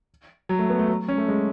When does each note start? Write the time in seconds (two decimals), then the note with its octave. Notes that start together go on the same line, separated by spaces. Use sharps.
0.49 F#3
0.59 A3
0.70 B3
0.79 A3
0.89 F#3
1.08 C#4
1.18 A3
1.28 G#3